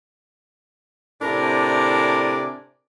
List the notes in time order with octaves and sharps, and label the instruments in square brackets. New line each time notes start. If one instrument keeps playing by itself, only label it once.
[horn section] A2 C3 D4 A#4 D5 G#5